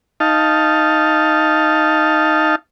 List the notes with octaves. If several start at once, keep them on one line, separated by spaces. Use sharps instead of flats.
D#4 F5 A5